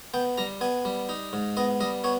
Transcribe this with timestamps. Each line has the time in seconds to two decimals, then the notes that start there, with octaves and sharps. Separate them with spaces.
0.14 B3 G5
0.37 G3 A#5
0.61 B3 G#5
0.85 G3
1.09 D#4
1.33 G#2
1.57 B3 D#5
1.81 G3 D#5
2.04 B3 C#5